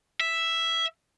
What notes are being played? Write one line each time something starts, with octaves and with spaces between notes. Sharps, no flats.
E5